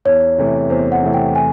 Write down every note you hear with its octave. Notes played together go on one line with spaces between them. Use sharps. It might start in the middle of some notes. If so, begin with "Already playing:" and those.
E2 C#5
C3 E3 A3
E2 C5
F#5
C3 E3 A3
G5
G#5